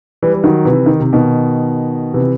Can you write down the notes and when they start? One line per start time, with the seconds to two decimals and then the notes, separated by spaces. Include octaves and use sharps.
0.22 E3 G3
0.34 E3
0.44 D#3 F#3
0.65 C3 E3
0.86 D#3
1.00 C3
1.13 B2 D#3
2.14 C3 E3